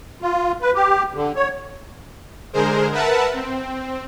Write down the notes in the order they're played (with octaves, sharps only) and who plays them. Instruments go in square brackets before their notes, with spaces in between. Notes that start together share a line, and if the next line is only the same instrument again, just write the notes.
[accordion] F4
B4
G4
D3
C#5
[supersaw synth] D3 G#3 G#4 A#4 C5
A#4 B4 E5 F#5 A5
C4